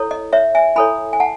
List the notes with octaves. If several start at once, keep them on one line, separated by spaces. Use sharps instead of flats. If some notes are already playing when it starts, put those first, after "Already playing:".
Already playing: E4 A4 C#5
D#5
C#5 E5
E5 G#5
E4 A4 C#5 G#5 B5
G#5
F#5 A5